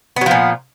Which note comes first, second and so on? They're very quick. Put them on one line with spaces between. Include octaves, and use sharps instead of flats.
B3 F#3 F3 A#2